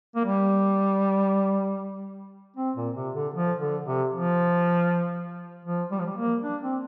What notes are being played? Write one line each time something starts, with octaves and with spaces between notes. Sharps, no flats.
A#3
G3
C4
A#2
C3
D3
F3
D3
C3
F3
F3
G3
F3
G3
A#3
D4
C4